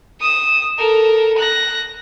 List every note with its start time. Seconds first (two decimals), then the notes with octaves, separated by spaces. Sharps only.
0.20 D#6 E7
0.78 A4 A#4
1.38 F#6 A#6